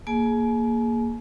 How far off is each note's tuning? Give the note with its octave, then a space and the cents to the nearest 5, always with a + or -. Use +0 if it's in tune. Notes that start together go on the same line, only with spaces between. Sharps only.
A#3 +0 G#4 +10 G#5 +40